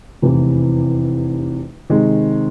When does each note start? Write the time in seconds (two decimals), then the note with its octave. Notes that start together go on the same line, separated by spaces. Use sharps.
0.22 F1 E2 C3 E3
1.90 C3 D#3 G#3